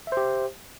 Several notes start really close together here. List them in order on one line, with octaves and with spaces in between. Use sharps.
E5 C5 G4